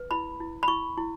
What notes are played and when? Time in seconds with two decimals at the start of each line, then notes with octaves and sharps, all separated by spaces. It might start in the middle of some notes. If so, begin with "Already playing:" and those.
Already playing: B4
0.11 E4 B5
0.40 E4
0.63 B5
0.68 E4 C#6
0.98 E4